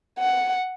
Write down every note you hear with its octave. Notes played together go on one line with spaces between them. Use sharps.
F#5